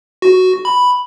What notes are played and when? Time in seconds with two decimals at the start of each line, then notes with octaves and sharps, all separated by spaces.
0.22 F#4
0.65 B5